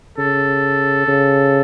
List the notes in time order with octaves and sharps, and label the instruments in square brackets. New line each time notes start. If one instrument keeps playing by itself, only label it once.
[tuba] C#3 [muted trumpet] A4
[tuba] C#3